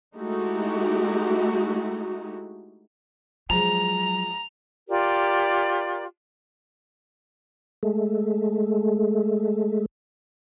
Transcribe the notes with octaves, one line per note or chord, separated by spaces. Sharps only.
G#3 A3 D#4 E4 F#4 G4
F3 F#3 G#3 A#5 F7
F4 G4 A#4 D5
G#3 A3